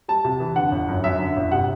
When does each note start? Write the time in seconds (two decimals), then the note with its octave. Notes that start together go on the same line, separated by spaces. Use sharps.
0.08 G3 A5
0.25 C3
0.40 E3
0.56 D3 F#5
0.72 G1
0.88 F#2
1.04 F#2 E5
1.19 D3
1.36 G1
1.52 C3 F#5